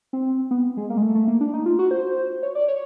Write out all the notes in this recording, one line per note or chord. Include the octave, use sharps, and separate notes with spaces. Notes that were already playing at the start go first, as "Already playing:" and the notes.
C4
B3
G#3
A#3
G#3
A3
A3
A#3
D4
D#4
F4
F#4
C5
C#5
D5
C#5